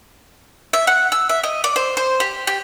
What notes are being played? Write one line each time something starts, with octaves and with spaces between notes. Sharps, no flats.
E5
F#5
E6
E5
D#5
D5
C5
C5
G4
G4